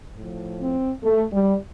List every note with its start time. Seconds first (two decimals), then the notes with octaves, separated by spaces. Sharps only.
0.16 A2 F3
0.59 C4
1.03 A3
1.33 G3